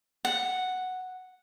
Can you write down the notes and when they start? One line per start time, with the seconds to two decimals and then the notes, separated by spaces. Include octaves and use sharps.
0.25 F#5